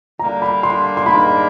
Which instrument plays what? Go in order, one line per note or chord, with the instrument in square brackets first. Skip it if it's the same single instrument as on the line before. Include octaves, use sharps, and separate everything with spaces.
[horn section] D3 G3 A#3 D4 [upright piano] A#5
[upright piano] B5
C6
C6
[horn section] G#2 D#3 G3 A#3 D4 [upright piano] B5